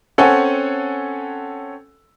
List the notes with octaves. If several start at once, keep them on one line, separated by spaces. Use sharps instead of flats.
C4 C#4 A4 C#5 F#5 G#5